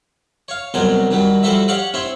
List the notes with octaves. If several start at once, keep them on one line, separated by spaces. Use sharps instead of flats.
C#5 F5
C2 B2 F#3 G#4 A#4 C5
D#3 F#3 G3
F3 G3 F#4 A4 C5 E5
G4 C#5 D5 F5 F#5
C4 E4 C5 C#5